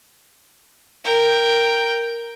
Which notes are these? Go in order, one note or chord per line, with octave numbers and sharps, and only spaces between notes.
A#4 G5